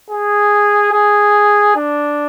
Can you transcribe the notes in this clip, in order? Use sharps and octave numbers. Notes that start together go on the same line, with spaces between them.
G#4
G#4
D4